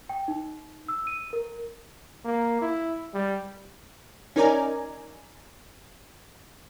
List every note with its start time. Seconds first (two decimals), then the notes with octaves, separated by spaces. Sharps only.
0.09 G5
0.28 D#4
0.88 E6
1.07 D#7
1.33 A#4
2.25 A#3
2.61 E4
3.14 G3
4.36 C#4 D#4 A#4 D5 G#5 A#5